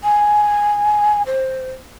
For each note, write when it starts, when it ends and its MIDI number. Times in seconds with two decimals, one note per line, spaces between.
0.03 1.22 80
1.26 1.72 72